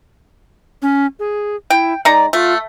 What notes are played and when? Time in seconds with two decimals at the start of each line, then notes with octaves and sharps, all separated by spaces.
0.82 C#4
1.19 G#4
1.70 E4 G5
2.05 G#3 D#4 D5 A#5
2.33 A3 F4